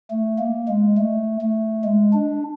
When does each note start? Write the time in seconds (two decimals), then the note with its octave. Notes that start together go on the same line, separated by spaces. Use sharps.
0.10 A3
0.39 A#3
0.68 G#3
0.97 A3
1.41 A3
1.84 G#3
2.13 D4